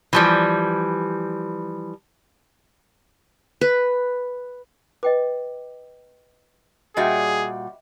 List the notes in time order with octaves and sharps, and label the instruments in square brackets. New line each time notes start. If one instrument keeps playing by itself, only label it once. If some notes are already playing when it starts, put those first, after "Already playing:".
[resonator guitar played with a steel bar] E3 F3 G3
[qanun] B4
[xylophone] B4 [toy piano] D#5 G5 D6
[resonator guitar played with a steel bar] A#2 G3 F#4 [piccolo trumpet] G#4 [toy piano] D#5 E5 G5